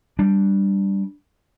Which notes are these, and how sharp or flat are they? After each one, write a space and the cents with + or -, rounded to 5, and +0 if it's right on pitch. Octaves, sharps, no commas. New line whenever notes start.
G3 +0 D4 +0